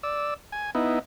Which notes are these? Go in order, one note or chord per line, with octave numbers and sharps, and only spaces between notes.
D5 E6
G#5
B3 D#4 E4